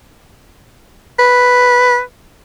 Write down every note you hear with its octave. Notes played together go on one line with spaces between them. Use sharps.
B4